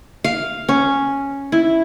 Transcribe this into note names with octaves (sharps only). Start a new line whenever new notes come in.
F5
C#4
E4